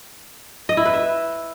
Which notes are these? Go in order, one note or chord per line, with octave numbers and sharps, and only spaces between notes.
D#5
E4
B4
E5